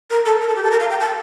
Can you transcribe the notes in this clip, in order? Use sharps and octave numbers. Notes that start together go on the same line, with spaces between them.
A#4
A4
A#4
A4
G4
A4
A#4
F5
G5
A5